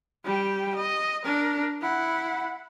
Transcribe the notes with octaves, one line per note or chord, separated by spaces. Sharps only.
G3 G5
D#5
D4 A#4
E4 F#5